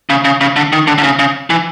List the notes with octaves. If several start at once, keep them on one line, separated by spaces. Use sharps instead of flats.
C#3
C#3
C#3
D3
D#3
D3
D3
C#3
C#3
E3